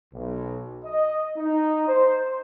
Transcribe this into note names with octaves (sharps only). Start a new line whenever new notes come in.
B1
D#5
D#4
C5